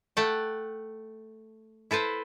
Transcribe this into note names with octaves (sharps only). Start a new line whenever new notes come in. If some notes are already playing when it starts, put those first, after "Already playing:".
A3 F#5 G5 A5
E4 A4 B4 C5